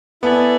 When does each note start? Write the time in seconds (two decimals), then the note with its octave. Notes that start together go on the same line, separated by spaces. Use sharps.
0.22 B3 E4 A4 D5 G#5